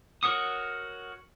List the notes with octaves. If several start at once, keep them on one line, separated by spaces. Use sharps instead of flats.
F#4 A#4 C#5 F#5 D#6